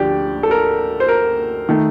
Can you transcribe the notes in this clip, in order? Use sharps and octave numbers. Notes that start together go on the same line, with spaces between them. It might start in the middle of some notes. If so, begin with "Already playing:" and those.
Already playing: D2 D3 F3 G4 D5
A4
A#4
C5
A#4
D#3 A3